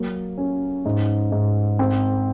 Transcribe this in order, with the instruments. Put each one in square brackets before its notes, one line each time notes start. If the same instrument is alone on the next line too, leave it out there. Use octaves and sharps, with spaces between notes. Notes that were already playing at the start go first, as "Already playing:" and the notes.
Already playing: [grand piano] F#3 A#3
C#4
G#2
G#2
C4